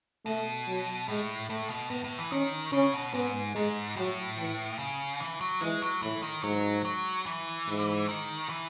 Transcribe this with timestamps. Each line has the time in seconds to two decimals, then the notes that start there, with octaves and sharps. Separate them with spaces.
0.26 B2 A3
0.67 F#3
1.08 A2 G#3
1.49 A2 A3
1.70 B2
1.90 A2 B3
2.04 A2
2.18 E3
2.32 D#3 C#4
2.73 C#3 C#4
2.94 B2
3.14 G#2 B3
3.55 G#2 G#3
3.96 A2 F#3
4.38 E3
4.79 C#3
5.20 E3
5.41 F#3
5.61 E3 G#3
5.82 F#3
6.02 A2 E3
6.23 D#3
6.43 G#2 F#3
6.85 F#3
7.26 E3
7.68 G#2
8.09 D#3
8.50 E3